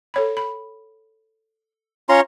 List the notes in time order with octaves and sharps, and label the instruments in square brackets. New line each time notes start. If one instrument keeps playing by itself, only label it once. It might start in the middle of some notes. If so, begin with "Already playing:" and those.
[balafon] A4 C#5 B5
B5
[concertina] C#4 [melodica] F4 A#5 C6 [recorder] C#5